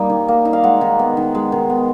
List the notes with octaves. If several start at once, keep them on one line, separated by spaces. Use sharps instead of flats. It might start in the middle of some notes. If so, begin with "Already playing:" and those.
Already playing: G3 A#3 D#4
D#3
A#3
D#4
F5
G#3 F#5
D#3
B3
D#3
G#3
D#3
B3